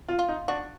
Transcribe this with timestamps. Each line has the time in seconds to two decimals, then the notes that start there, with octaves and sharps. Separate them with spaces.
0.09 F4
0.19 F4
0.29 D#4
0.48 D4 F#4